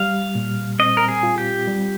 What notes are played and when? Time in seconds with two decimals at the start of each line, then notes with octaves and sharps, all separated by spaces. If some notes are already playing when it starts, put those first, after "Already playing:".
Already playing: G3 F5
0.35 A#2
0.79 C4 D#5
0.97 A#4
1.08 G#4
1.23 F4
1.38 G4
1.67 G3